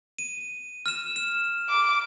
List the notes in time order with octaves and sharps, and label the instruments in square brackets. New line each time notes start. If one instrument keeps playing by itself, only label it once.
[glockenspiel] D#7
F6 E7
E7
[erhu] D6